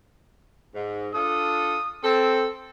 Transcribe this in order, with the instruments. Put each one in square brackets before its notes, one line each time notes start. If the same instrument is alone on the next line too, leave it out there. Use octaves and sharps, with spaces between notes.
[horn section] G#2
[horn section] D4 F4 A4 [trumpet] D#6
[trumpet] C4 [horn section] A4